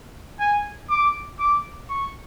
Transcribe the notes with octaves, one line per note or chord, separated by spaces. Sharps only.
G#5
D6
D6
C#6